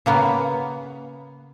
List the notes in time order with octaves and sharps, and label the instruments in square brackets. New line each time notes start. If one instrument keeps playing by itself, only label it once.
[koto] C#3 A#3 B3